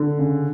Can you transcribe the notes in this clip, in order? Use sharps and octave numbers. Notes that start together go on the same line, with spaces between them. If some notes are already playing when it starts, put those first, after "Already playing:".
Already playing: D3
C#3